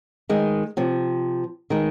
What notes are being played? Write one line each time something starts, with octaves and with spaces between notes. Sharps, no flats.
D#3 G#3
C3 F3
D#3 G#3